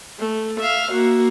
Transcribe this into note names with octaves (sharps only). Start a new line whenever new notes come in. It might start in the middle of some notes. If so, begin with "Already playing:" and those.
A3
E5 F5
A#3 F#4